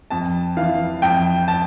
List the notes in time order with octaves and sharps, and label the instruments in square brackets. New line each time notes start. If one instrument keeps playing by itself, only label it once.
[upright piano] F2 A5
E3 F5
F2 G5
A5